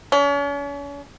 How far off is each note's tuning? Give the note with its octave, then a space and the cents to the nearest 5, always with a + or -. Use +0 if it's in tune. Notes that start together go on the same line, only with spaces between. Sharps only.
C#4 +40